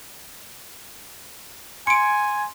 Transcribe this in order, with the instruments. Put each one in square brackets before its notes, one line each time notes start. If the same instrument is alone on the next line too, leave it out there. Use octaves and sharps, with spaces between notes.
[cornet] G#5 [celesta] C6 [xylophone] C#7 D7